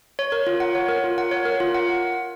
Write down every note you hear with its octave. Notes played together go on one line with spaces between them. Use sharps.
C#5
A#4
F4
F#5
C#5
A#4
F4
F#5
C#5
A#4
F4
F#5